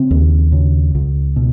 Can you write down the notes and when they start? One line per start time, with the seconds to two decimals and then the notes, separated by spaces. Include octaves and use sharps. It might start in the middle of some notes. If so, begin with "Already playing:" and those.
Already playing: C#3 C4
0.11 D#2
0.52 C#3
0.95 C#2
1.36 B2